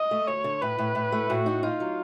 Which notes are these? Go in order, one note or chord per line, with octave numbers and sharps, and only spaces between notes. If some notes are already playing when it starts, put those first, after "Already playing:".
Already playing: D#5
A3
D2 C#5
D3
A2 B4
A2
A2
A3
A2 F#4
D#4
D#4 F4
F#3